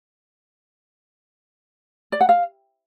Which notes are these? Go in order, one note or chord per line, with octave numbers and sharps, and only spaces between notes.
D5
F#5
F5